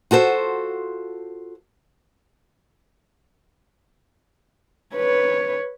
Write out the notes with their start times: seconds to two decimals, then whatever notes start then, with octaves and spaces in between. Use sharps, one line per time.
0.11 F4 F#4 A4 C5
4.95 B4 C#5